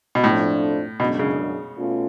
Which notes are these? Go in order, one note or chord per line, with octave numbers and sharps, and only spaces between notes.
B2
F2 A2 F3 A3 D4
F#2 B2 D3 G#3 D4
C#3
B2 A3 C#4 F4